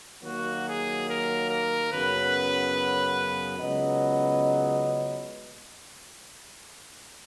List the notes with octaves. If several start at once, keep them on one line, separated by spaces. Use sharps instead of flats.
D#2 D#3 F#3 A#3 F#4
G#4
A#4
A#4
F#2 C#3 F#3 B3 B4
C#2 C#3 F#3 B3 D#5